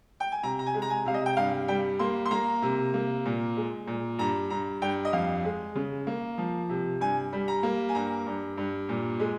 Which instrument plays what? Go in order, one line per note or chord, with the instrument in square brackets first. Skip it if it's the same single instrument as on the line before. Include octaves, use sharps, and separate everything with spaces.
[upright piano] G5
G#5
C3 A#5
A#5
G#5
G#3
A#5
G#5
C3 F5
D#5
G5
G2 F5
G3 G5
A#3 C6
C6
A#3 A#5
C3
A#3
A#2
G#3
A#2
G2 A#5
G2 A#5
G2 G5
D#5
F2 F5
G#3
C#3
A#3
F3
C3
G2 G#5
G3
A#5
A#3
G#5
G2 A#5
G2
G2
A#2
G#3